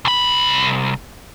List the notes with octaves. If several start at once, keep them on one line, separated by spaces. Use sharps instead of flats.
C2 B5